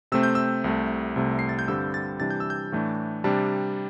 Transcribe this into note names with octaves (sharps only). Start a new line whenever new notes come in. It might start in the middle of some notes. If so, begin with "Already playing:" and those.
C3 A3 C4 E6
G6
E6
C2 C3 A3
C2 C3 A3
C7
A6
G6
G2 D3 G3 C4 E6
A6
C3 E3 G3 D4 A6
G6
E6
G6
A2 E3 A3 D4
C3 G3 D4 A5